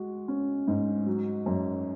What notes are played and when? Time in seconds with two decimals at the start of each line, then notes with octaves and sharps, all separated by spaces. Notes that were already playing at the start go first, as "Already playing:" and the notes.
Already playing: G#3 F#4
0.28 C#4
0.68 G#2
1.06 F#3
1.46 F#2